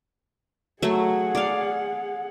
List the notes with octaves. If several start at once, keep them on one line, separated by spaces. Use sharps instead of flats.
F#3 A3 G#4 F#5
D5 F5